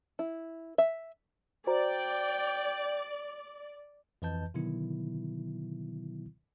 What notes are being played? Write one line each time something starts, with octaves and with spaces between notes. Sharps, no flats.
E4
E5
F#4 C5 D5 G5 A#5
F2 E3 B4 D#5 A5 G6
B2 D3 D#3 F#3 B3 E4